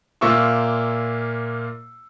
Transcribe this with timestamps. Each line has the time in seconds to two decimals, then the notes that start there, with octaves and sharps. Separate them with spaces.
0.21 A#2 A#3 F4 E5 C#6 E6